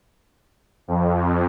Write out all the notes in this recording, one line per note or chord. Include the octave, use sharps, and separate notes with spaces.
F2